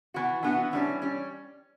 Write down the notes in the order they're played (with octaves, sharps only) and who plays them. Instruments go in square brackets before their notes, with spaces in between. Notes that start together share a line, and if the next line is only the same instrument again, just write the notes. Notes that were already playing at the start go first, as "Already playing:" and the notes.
[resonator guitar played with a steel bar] E3 B3 F#4
[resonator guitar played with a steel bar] E3 B3 F#4 [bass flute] D4
[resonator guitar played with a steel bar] E3 G3 C#4 [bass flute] D4
[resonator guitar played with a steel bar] G3 C#4